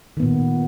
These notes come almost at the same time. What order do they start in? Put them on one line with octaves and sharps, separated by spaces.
D#3 B3 A#2